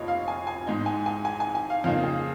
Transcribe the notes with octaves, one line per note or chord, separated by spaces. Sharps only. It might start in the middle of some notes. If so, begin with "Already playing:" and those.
Already playing: F1 F2 F3 A#3 C#5 D#5
F5
G#5
G#5
G#2 G#3 D#4
G#5
G#5
G#5
G#5
G#5
F5
F2 C#3 A#3 D#4 F5
G#4